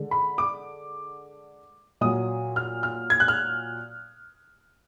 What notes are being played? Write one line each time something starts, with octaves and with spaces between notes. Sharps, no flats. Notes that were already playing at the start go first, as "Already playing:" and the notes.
Already playing: D3 G#3
B5
D6
A#2 F#3 D#6
F6
F6
G#6
F#6
F6